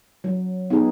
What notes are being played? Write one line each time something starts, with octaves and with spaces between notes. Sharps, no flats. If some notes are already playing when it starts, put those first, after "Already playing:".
F#3
B3 D#4 G#4